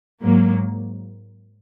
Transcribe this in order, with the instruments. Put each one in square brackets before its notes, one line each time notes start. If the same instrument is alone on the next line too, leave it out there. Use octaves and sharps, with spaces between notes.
[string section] G#2 F#3 A#3